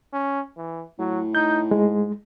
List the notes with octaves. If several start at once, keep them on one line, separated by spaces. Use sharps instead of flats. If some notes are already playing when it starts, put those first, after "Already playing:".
C#4
E3
A2 F#3
D#4 G6
G#2 G#3